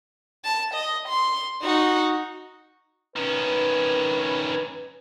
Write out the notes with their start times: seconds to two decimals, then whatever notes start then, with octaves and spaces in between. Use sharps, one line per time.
0.45 A5
0.74 D#5
1.08 C6
1.62 D#4 F#4
3.16 D#3 C#4 B4